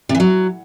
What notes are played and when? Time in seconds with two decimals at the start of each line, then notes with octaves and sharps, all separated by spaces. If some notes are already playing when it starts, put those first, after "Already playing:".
0.09 C3
0.15 E3
0.20 F#3